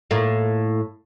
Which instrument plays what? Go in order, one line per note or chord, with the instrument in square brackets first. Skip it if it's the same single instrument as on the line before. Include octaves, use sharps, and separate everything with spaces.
[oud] A2 A#3 F4